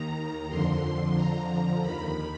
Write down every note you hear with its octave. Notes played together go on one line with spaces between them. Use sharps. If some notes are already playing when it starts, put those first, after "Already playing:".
Already playing: D#2 D#3 A#5
F2 D3 F3 C6
F2 D3 F3 A#5
D#2 D#3 B5